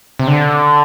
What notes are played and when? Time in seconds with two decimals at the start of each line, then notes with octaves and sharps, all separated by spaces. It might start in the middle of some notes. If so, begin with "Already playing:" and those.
0.19 C3
0.28 D3